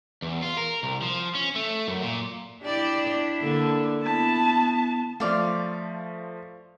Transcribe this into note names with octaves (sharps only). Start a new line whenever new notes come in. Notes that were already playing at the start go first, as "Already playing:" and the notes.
E2
F4
A#4
C2
F3
C#4
A3
F#2
A#2
D4 E4 G4 D5
D3 A#3
B3 E4 A5
F3 A3 F4 D5 F5